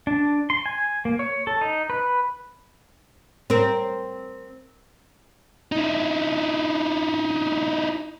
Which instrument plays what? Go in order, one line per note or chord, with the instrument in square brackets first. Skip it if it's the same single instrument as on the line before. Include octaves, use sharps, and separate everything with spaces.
[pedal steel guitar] D4
C6
G#5
A#3
C#5
A4
D#4
B4
[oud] C4 A#4
[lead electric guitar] D#4 E4